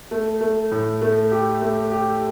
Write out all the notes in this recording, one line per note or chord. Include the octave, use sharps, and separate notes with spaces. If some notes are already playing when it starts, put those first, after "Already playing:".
A3
A3
A2
A3
G4
A3
G4